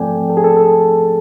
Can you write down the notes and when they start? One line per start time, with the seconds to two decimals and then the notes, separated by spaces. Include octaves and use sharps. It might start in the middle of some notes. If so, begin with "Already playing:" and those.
Already playing: G#2 F3 A3 C4 A4 D5 G5 G#5
0.30 A4
0.37 G#4
0.44 A4
0.57 A4